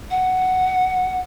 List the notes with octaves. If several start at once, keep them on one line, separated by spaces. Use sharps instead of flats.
F#5